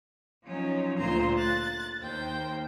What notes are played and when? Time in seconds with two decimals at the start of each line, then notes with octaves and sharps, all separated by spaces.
0.45 F3 F#3 C#4 D#4
0.98 D2 A#2 F4 C5 A#5 C6
1.36 F#6 A6
2.00 D#2 D#3 C5 G5